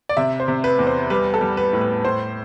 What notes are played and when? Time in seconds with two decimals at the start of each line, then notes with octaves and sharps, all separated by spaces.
0.09 D5
0.17 C3 E5
0.40 C5
0.48 C3
0.64 B4
0.79 E2
0.87 C5
1.10 G3 B4
1.34 A4
1.41 G3
1.57 B4
1.73 A2
1.81 B4
2.04 A2 C5